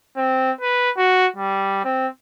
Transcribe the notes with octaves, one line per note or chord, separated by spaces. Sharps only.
C4
B4
F#4
G3
C4